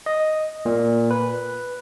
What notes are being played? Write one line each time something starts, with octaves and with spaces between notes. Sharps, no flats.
D#5
A#2
B4